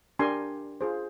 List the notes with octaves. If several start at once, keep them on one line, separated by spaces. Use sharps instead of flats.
D4 G4 A#4 G#5 C6
F4 G#4 C5